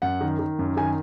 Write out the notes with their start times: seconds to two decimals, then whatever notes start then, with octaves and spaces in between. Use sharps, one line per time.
0.02 F#2 F#5
0.21 D#3
0.39 D#3
0.59 F#2
0.77 D#3 G#5